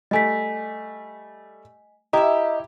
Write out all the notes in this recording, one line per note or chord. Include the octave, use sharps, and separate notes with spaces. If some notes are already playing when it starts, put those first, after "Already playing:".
G3 A3 D#5 G#5 B6
E4 G4 D#5 E5 A#5